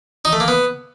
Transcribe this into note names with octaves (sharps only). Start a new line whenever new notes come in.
D#4
A3
A#3
B3